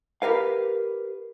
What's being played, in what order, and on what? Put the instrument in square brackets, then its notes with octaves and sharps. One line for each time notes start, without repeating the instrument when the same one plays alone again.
[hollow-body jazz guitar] G4 A#4 B4 F5